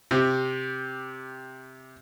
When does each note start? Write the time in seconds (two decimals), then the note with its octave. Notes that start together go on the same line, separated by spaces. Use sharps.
0.11 C3 G4